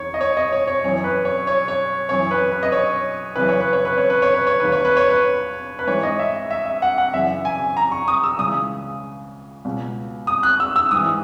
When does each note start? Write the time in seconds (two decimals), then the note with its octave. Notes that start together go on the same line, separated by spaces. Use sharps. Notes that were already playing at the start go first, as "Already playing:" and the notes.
Already playing: E2 D#3 C#5
0.14 D#5
0.21 C#5
0.37 D#5
0.52 C#5
0.68 C#5
0.84 F#2 E3 C#5
1.04 B4
1.25 C#5
1.47 C#5
1.68 C#5
2.09 F#2 E3 C#5
2.31 B4
2.51 B4
2.63 D#5
2.72 C#5
3.35 F#2 C#3 E3 B4
3.48 C#5
3.60 B4
3.73 C#5
3.85 B4
3.98 C#5
4.10 B4
4.22 C#5
4.34 B4
4.47 C#5
4.60 D#2 D#3 B4
4.72 C#5
4.85 B4
4.97 C#5
5.09 B4
5.79 B4
5.87 G#2 E3 C#5
6.03 D#5
6.19 E5
6.50 E5
6.66 E5
6.82 F#5
6.98 F#5
7.13 F#2 C#3 E3 E5
7.45 G#5
7.77 A#5
7.92 C#6
8.08 D#6
8.24 E6
8.39 C#2 C#3 E3 D#6
9.65 C#2 B2
10.27 D#6
10.43 F#6
10.60 E6
10.76 E6
10.91 G#2 E3 D#6